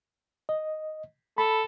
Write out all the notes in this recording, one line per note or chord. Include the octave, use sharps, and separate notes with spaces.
D#5
A4 B5